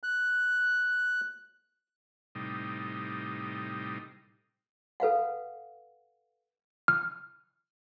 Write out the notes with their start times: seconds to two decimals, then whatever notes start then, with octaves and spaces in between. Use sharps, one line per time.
0.03 F#6
2.35 A2 C3 G3 D#4
5.00 A4 B4 F5 F#5
6.88 F6